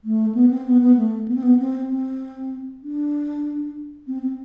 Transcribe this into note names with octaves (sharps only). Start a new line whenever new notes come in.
A3
B3
C4
B3
B3
A3
B3
C4
B3
C4
C4
D4
C4
C4